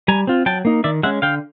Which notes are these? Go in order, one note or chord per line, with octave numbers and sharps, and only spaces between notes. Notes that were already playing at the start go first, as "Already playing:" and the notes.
G3 G#5 A#5
C4 F4
F#3 G5 A5
A#3 D#4
D#3 D5 E5
G#3 C#4 E5 F#5
D3 F5 G5